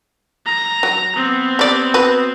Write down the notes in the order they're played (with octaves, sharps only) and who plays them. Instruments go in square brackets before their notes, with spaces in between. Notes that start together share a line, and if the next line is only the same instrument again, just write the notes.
[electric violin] A#5
[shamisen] F#3
[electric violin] B3 C4
[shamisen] G3 D5
F#4 B4